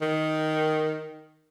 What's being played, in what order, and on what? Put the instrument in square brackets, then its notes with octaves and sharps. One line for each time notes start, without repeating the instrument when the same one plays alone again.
[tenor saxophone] D#3